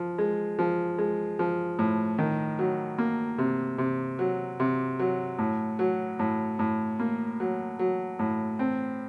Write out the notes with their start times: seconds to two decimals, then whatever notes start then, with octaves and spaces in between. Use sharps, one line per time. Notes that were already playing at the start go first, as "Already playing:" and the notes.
Already playing: F3
0.18 G#3
0.59 F3
0.98 G#3
1.39 F3
1.79 A2
2.18 D#3
2.59 F#3
2.98 A#3
3.38 C3
3.78 C3
4.19 F#3
4.60 C3
4.99 F#3
5.39 A2
5.79 F#3
6.19 A2
6.59 A2
7.00 A#3
7.40 F#3
7.79 F#3
8.19 A2
8.59 C4